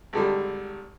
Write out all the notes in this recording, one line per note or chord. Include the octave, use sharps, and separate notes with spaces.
G#1 D3 G3